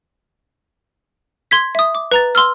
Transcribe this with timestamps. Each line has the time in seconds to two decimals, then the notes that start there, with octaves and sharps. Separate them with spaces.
1.51 C6 G#6 B6
1.75 E5 D#6
1.95 D6
2.12 B4 A#5 A6
2.35 C6 E6 F6